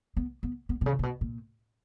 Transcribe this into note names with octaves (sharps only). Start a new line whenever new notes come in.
B3
B3
B3
B2
C#3
A#2
B2
A#2